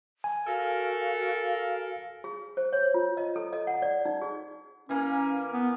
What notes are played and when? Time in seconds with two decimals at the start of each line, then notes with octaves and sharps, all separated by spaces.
0.24 G#5
0.47 F#4 A4 A#4 F5
2.24 G#4
2.57 C5
2.73 C#5
2.94 F4
3.17 D#5
3.36 A4
3.53 D#5
3.67 F#5
3.82 D5
4.05 D#4
4.22 G#4
4.89 E3 A#3 C#4
5.53 B3